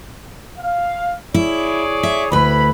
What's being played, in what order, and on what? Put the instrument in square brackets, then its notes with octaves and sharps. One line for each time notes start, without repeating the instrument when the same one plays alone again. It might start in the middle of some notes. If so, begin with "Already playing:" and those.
[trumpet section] F5
[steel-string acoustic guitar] E4 [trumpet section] G#4 C#5 D5
[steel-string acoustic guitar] E5
[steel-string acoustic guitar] D2 B4 [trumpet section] E4 B5